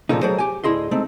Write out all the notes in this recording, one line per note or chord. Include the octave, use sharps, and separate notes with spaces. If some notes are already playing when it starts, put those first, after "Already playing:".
A#2 C#3 F3 A3 A#3 D#4
F#3 A3 G#4 A#4 C5 D#5
G4 G#5
D2 A2 E4 G#4 D#5 C6
G#3 A3 C4 D#4